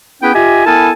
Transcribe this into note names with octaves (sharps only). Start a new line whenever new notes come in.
B3 C#4 E4 G#4 B4 G5
F4 G4 D#5 E5 G#5
B3 E4 A4 A#4 G#5 A5